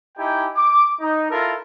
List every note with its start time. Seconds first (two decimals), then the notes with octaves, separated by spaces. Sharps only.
0.17 D#4 E4 G4 G5 G#5
0.57 D6
1.01 D#4
1.30 E4 F4 A4 A#4